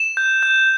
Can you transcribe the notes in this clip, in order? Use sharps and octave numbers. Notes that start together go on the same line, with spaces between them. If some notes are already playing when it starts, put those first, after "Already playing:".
Already playing: E7
G6
G6